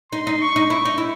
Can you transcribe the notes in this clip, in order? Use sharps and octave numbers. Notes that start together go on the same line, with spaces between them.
D#4 C6
D#4
C#6
D#4
E4 C#6
D#4
E4